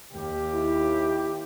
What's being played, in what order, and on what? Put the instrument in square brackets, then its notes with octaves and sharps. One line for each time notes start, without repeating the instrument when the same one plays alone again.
[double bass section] D#2 [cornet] G4
[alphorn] E4